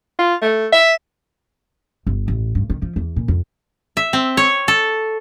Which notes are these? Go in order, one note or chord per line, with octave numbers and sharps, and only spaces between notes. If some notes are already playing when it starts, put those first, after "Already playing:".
F4
A3
E5
G1
A1
G2
D#3
F3
E2
A#2
F2
E5
C4
C#5
A4